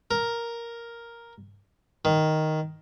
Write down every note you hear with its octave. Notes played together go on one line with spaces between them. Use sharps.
A#4
D#3